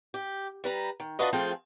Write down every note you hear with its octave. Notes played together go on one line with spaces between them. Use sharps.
G4
G3 B4 A#5
D#3
D4 F4 F#4 B4 D#5
F3 A3 C4 F4 G#4 G5